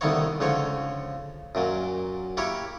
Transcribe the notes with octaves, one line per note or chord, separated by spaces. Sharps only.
C2 D3 D#3 A#3 B3 C#5
C#2 D3 F3 C#5
F#2 A#2 F#3
A#3 E4 G4 A#4 C#5